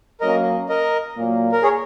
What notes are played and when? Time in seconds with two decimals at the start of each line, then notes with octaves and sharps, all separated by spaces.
0.21 F#3 A#3 C#4 A#4 D#5
0.69 A#4 D#5
1.16 A#2 F#3 A#3
1.52 A#4
1.63 G#4 C#5